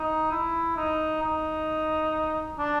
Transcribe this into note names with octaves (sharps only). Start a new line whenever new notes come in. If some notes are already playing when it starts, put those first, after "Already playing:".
Already playing: D#4
E4
D#4
D#4
D4